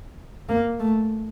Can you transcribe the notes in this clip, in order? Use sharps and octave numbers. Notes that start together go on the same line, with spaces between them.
A#3
A3